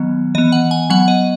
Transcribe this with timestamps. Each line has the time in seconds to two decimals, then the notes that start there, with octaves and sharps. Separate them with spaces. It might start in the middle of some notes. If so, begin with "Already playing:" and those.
Already playing: D#3 F#3 B3
0.35 E3 B3 D#5
0.52 F#5
0.71 G#5
0.90 F#3 B3 F#5
1.08 D#5